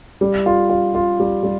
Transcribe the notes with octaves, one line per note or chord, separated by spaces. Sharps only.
G3
F4
F4
F4
G3
G3